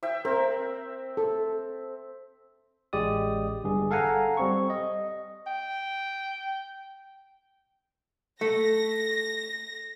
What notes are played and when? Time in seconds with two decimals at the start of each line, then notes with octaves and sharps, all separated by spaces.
0.03 E5 G5
0.25 C4 A#4
1.17 A4
2.93 A1 G#3 G4 D5 D#6
3.64 G1 G2 G#4
3.91 A4 F5 F#5 G#5 A#5
4.37 G3 C4 C#6
4.70 D#5
5.47 G5
8.41 A3 A#6